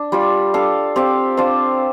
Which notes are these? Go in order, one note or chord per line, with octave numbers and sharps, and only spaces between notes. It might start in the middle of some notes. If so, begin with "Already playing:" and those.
Already playing: D4
G3 F4 D5
D4 A4 F5
C4 G4 F5
D4 F4 C5 F5